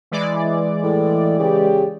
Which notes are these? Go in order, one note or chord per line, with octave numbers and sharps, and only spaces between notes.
E3 G#3 D5
A2
C#3 G4